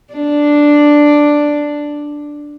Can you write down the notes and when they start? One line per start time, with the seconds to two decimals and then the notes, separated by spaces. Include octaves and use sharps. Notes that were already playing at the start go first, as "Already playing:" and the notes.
0.13 D4